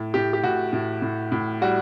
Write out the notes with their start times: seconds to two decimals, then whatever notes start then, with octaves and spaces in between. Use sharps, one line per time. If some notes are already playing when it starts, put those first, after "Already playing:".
Already playing: A2
0.14 A2 G4
0.33 G4
0.43 A2 F#4
0.73 A2
1.02 A2
1.32 A2
1.61 G3 F#4